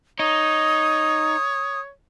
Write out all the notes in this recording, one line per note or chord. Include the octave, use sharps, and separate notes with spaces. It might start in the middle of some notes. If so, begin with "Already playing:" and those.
D#4 C#5 D#6